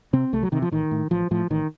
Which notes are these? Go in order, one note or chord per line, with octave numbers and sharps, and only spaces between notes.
C3 C4
C2 A3
F#3
C3 D#3
F3
A1 D#3
A2
A1 F3
A2 F3
A1 D#3